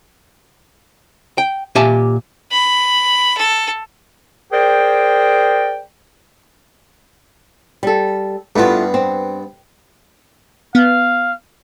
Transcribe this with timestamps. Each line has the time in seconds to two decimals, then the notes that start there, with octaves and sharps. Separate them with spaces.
1.38 G5
1.75 A#2 G4 E5 G#5 A5
2.51 B5
3.37 A4
4.53 G#4 A#4 C5 D5 G5
7.83 G3 A4
8.56 G2 A3 B3 E4 F4
8.94 C4
10.75 B3 F5